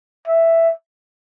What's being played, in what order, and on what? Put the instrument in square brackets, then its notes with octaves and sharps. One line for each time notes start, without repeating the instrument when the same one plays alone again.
[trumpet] E5